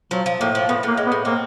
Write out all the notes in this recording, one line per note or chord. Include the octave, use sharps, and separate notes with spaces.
F3 F#3
F3
A2 A#3
F3
A2 B3
A2 A#3
G#3
B3
A2
A#3 C4